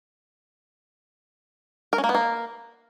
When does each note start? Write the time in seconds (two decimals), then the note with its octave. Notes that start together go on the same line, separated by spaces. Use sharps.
1.93 A#4
1.98 C#4
2.04 A#3
2.09 B3
2.15 A#3